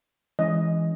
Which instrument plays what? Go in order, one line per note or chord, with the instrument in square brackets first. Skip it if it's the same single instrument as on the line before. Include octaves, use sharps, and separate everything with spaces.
[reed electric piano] E3 G#3 C#4 [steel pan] D#5